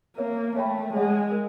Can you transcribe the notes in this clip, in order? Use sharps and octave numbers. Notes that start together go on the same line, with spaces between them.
A#3 A#4 C#5 E5
A3 C#5 E5 G5 B5
G#3 G#4 C#5 F#5
A#4